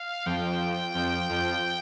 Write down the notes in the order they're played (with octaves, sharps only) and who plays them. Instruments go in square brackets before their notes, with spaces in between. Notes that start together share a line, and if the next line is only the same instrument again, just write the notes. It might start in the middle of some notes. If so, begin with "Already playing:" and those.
Already playing: [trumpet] F5
[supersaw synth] F2 F3 [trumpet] G5
[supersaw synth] F2 F3
F2 F3